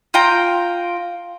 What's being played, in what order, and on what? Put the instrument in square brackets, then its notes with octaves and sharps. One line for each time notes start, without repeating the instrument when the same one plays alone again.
[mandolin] F4 G5 A#5